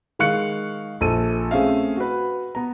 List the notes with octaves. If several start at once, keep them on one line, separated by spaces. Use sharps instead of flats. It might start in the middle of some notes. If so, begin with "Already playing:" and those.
D#3 G#3 F5 C#6 F#6 C#7
A#1 A4 D#7
A3 C4 C#4 G#4 E5 F5
F#4 B4
B3 A#5